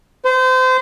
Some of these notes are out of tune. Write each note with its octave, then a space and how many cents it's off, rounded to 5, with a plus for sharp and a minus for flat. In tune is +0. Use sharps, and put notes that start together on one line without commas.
C5 -30